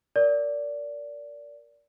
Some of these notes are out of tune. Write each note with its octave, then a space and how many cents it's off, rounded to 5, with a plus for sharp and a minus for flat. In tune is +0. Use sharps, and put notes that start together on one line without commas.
A#4 +0 D5 -20